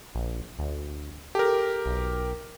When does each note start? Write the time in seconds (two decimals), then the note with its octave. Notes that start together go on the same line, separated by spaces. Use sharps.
0.15 A#1
0.59 D2
1.35 G4 A4 A#4
1.86 B1